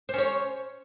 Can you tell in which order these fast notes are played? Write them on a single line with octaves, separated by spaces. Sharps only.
C5 C#4 C#5